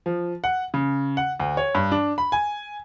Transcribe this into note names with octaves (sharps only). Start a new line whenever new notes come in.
F3
F#5
C#3
F#5
D2
C#5
G2
D4
B5
G#5